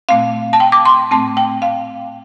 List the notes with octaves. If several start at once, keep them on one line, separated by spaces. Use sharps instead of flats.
A#2 A3 C4 F5
A5
G5
D6
C6
A2 A3 C4 A5
G5
F5